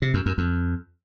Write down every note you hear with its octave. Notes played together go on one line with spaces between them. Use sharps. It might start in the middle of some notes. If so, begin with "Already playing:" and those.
C3
F#2
F#2
F2